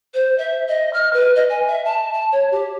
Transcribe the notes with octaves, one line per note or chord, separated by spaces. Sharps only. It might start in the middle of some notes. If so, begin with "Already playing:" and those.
C5
E5
D#5
F6
B4
D#5
G#5
E5
A5
A5
C#5
G4